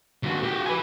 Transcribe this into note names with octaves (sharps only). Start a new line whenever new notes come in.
D#2 F#4
F#4 G4
B4 G#5